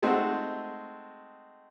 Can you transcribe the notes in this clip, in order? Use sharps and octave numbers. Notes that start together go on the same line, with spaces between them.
G#3 A3 C4 D#4 F#4